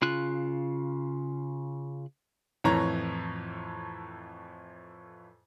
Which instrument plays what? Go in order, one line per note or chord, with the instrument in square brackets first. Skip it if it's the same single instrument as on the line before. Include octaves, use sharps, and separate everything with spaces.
[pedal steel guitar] C#3 F4 F#6
[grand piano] F2 A2 E3 C#5 A#5